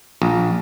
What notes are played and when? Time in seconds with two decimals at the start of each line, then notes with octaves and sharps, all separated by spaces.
0.22 A#1